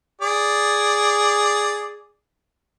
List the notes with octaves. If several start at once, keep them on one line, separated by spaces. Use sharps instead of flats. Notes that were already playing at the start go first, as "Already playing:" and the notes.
G#4 D5